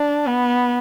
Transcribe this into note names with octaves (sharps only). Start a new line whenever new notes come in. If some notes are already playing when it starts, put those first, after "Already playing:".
Already playing: D4
B3